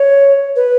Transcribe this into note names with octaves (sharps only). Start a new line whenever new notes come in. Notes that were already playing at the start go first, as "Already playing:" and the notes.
Already playing: C#5
B4